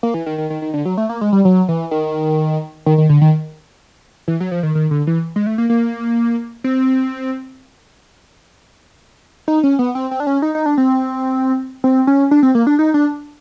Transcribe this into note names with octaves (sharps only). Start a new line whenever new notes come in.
A#3
E3
D#3
D#3
D#3
D#3
D3
F#3
A3
A#3
G#3
G3
F#3
E3
D#3
D#3
D#3
D3
D#3
E3
F#3
F3
D#3
D#3
D3
E3
G#3
A3
A#3
A#3
C4
D#4
C#4
B3
C4
C4
D4
C#4
D#4
D#4
D4
C4
C4
C#4
D4
C4
A#3
D4
D#4
D4